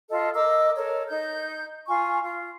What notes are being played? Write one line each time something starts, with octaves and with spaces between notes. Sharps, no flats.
F4 A4 D#5
A#4 D#5 D6 E6
A4 A#4 C#5
D#4 G6
F4 G#5 C#6
F4